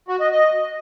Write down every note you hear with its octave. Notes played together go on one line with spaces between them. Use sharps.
F#4
D#5
D#5